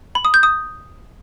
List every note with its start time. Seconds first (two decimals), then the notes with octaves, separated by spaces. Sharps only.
0.15 B5
0.25 D#6
0.34 G6
0.43 D#6